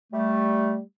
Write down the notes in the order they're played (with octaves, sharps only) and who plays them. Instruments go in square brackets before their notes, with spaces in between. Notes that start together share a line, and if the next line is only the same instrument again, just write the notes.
[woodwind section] G3 A3